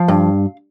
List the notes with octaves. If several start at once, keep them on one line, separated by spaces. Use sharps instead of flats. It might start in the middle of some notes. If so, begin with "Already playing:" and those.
Already playing: F3 F5
G2